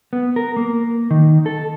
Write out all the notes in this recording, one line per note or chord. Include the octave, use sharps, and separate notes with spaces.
B3
A#4
A#3
D#3
A4